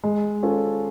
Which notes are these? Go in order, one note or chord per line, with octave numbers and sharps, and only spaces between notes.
G#3
C#4 F4 A4